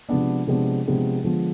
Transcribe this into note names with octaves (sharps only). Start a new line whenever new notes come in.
C3 F3 G#3 B3 D4
C3 F3 G#3 B3 D4
C3 F3 G#3 B3 D4
D3 F3 G#3 B3